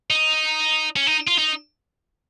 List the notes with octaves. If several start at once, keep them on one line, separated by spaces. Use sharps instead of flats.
D#4
C#4
D#4
F4
D#4